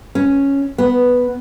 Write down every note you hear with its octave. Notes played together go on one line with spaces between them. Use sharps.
C#4
B3